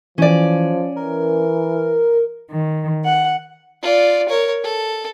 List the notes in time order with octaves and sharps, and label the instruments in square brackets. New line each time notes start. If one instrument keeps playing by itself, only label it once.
[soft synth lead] E3 [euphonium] F3 [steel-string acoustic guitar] C#4 D5
[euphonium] E3 [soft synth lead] A#4
[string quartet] D#3
F#5
[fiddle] F4 D5
A#4 C#5
A4